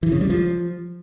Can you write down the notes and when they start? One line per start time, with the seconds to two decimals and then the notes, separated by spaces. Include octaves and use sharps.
0.03 E3
0.12 C#3
0.21 G3
0.30 F3